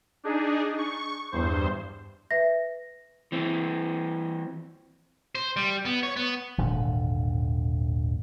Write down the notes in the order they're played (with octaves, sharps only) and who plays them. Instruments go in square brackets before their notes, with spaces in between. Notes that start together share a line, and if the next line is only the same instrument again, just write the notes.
[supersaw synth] D4 D#4 G#4
C#6
E2 G2 C5
[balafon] B4 E5 [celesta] A#6
[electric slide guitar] E3 C4
[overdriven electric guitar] C5
G3
B3
C#5
B3
[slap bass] D#1 G#1 D3